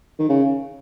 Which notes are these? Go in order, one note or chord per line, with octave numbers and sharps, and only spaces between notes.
D#3
C#3